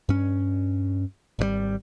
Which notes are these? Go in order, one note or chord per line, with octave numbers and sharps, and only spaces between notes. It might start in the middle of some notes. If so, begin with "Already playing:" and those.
G2 C#4
G#1 C3 G3